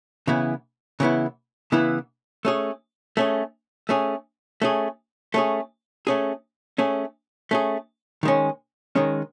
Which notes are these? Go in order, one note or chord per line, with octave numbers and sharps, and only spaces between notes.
C#3 E3 B3 E4
C#3 E3 B3 E4
C#3 E3 B3 E4
A3 C#4 G#4
A3 C#4 G#4
A3 C#4 G#4
A3 C#4 G#4
A3 C#4 G#4
A3 C#4 G#4
A3 C#4 G#4
A3 C#4 G#4
D#3 G#3 C#4
D#3 G#3 C#4